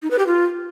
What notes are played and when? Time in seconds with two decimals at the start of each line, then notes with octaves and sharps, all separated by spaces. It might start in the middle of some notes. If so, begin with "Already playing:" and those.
0.03 D#4
0.11 B4
0.19 G4
0.27 F4